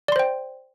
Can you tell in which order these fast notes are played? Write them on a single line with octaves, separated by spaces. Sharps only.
D5 C6 C5 G5